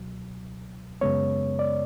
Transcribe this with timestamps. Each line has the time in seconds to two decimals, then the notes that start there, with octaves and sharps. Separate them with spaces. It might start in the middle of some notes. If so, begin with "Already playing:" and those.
Already playing: C#2 B2 F#3
1.01 F#2 C#3 G#3 B3 C#5
1.59 D5